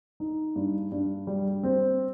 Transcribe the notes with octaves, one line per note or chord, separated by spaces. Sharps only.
D#4
G2
G2
G3
C4